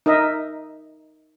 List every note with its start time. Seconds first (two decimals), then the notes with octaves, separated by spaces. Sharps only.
0.06 D#4 A#4 D#5 E5